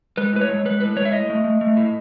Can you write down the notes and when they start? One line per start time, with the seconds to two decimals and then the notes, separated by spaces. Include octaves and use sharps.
0.17 G#3 B4
0.33 A2 B4
0.41 C#5
0.49 G#3
0.65 G#3 B4
0.80 A2 B4
0.96 G#3 C#5
1.05 E5
1.12 A2 D#5
1.29 A3
1.44 A3
1.61 A3
1.77 A2